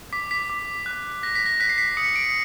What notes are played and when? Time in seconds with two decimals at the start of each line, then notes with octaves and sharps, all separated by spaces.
0.13 D6 B6
0.31 B6
0.50 D6
0.86 F#6
1.23 F#6 A#6
1.35 B6
1.46 A#6
1.60 F#6 B6
1.69 C7
1.78 B6
1.97 D#6 C#7
2.16 D7